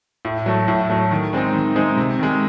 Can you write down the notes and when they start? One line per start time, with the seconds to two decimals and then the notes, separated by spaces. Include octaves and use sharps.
0.25 A2
0.46 F#3 A3
0.68 A2
0.90 F#3 A3
1.11 D#3
1.33 G#3 C4 D#4
1.54 D#3
1.76 G#3 C4 D#4
1.97 C3
2.19 D#3 G#3